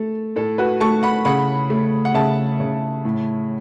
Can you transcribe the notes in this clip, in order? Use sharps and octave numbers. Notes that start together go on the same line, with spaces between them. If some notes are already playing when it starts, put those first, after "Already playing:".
Already playing: A3 A4
A2 A4
F#4 B4
A3 A5 C#6
F#5 B5
C#3 F#5 B5
A3
F#5
C#3 E5 A5
C#3
A2